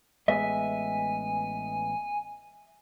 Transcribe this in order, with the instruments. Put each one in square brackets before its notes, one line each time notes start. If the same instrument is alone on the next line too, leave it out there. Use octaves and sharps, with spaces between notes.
[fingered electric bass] A1 G#3 B3 [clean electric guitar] D#5 E5 [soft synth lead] G#5